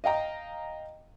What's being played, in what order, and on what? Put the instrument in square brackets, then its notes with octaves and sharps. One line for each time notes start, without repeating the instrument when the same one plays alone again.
[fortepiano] D#5 F5 G5 A#5